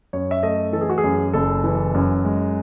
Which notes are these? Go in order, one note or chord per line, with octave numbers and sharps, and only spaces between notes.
F#2 C#5
E5
A3 D#5
E3 A4
G#4
F#4
G#4
F#2
F#1 A4
E3
F#2
G#3